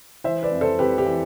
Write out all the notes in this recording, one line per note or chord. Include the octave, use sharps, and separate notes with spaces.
E3 C5 E5
B4 D5
F2
A4 C5
F2 G4 B4
G4
E3